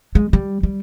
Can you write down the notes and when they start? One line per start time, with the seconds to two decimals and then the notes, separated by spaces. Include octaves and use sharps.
0.15 G#3
0.33 G3
0.63 G3